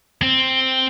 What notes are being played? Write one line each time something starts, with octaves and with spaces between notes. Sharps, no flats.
C4